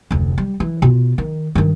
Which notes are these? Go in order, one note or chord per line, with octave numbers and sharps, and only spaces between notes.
F1 D2
G3
E3
B2 F4
D#3
G2 D#3